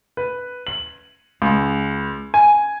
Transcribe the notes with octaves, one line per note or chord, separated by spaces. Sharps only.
B4
F#7
C#2
G#5